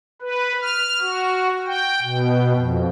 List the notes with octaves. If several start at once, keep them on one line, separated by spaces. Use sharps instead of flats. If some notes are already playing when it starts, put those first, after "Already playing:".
B4
F6
F#4
G5
B2
F2